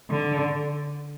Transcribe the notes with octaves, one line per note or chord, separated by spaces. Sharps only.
D3